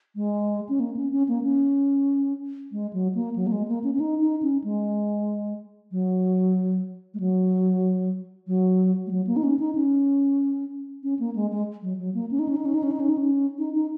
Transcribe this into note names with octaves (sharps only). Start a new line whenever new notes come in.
G#3
C#4
A#3
C#4
C#4
A#3
C#4
G#3
F#3
A#3
F#3
A#3
G#3
A#3
C#4
C#4
D#4
D#4
C#4
G#3
F#3
G#3
F#3
F#3
G#3
F#3
A#3
D#4
C#4
D#4
C#4
C#4
A#3
G#3
G#3
F#3
F#3
A#3
C#4
D#4
C#4
D#4
C#4
D#4
C#4
D#4
C#4
D#4
C#4
D#4
D#4